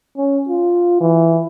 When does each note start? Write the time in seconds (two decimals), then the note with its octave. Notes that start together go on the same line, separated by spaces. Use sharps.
0.17 C#4
0.49 F4
1.01 E3